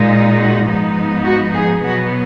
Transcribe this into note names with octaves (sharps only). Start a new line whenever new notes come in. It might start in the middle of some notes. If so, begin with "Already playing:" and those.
Already playing: A#2 G#3 D#4
F#4
G#2 F3 B3 D#4
F#4
G#4
B2 F#3 B3 F#4